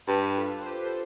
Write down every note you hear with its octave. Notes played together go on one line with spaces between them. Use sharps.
G2 G4 B4
F4 A4
C5
G4 B4
A4 C5